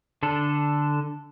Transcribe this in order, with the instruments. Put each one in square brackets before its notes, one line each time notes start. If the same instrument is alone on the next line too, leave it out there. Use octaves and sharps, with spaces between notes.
[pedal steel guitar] D3 D4 A4